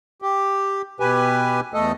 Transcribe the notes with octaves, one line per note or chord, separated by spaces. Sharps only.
G4
B2 G4 B4 G#5
E2 A3 A4 D#5